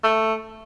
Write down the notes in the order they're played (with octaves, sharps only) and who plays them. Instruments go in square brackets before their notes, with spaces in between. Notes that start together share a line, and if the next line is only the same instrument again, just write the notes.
[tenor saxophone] A3